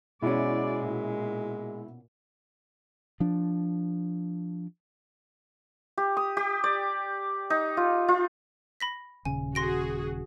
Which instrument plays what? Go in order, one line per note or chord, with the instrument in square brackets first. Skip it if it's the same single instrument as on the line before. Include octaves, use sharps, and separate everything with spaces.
[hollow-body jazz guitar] B2 C#4 [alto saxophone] G#3 [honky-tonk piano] E4 F#4 [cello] D5
[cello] A#2
[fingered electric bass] F3 D4
[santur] G4
D#6
G4
D5
D#4
F4
F4
[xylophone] B5 A#6 B6
[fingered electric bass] D#1 C#3 [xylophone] G#5
[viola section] F#4 G#4 [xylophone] C6 A#6 D7